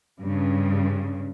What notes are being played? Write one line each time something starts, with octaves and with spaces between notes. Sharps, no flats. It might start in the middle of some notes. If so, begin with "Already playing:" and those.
G2 C#3